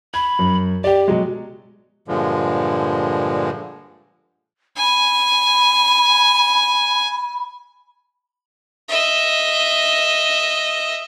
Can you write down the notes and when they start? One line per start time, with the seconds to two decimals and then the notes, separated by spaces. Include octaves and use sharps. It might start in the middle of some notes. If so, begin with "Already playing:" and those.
0.14 B5 G#6
0.39 F#2
0.84 G4 D5 G5
1.08 B2 F#3 G#3
2.08 G2 A#2 D3 F3 G#3
4.77 G#5 B5
8.88 D#5 E5